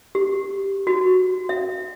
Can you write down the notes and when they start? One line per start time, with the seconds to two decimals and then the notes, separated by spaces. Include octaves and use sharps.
0.15 G4
0.87 F#4
1.49 E5